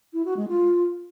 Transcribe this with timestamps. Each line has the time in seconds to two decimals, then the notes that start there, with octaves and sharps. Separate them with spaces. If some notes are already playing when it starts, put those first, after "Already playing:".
0.13 E4
0.25 F#4
0.37 G#3
0.48 F4